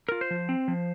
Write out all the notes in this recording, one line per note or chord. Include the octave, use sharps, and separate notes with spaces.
F4 A#4
C5
F3
C4
F3